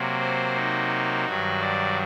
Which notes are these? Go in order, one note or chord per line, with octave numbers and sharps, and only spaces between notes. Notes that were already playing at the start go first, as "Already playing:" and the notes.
Already playing: C3 F#3 A#3
C5
D#4
G2 D#3 F#3 F#4
D5